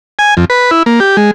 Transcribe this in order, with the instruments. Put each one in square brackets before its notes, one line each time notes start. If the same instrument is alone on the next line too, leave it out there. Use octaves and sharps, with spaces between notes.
[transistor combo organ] G#5
F2
B4
E4
A#3
G4
G#3